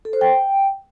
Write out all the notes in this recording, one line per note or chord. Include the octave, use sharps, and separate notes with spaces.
A4
C5
G5